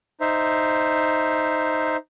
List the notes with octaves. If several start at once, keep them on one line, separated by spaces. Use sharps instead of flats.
D#4 C5 E5